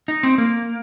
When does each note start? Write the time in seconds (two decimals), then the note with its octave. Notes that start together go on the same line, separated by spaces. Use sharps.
0.08 D#4
0.23 C4
0.38 A#3